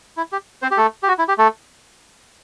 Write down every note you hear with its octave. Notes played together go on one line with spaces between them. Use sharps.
E4
G4
C4 C5
G4
A3 A4
G4
F#4
E4
G4
A3 A4